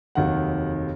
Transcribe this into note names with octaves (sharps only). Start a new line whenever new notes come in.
F1 D#2 D#3 F#3 F#5